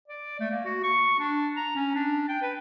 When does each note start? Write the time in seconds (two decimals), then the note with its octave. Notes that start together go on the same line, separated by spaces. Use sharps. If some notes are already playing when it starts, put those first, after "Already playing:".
0.08 D5
0.40 A3
0.51 A#3
0.65 F#4
0.84 C#6
1.19 D4
1.56 A#5
1.75 C#4
1.95 D4
2.29 G5
2.42 B4